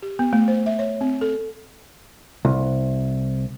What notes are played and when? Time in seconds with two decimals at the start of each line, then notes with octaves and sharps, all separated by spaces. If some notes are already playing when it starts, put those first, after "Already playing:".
0.02 G4
0.19 B3
0.33 A3
0.48 C5
0.66 E5
0.79 C#5
1.01 C4
1.21 A4
2.45 C2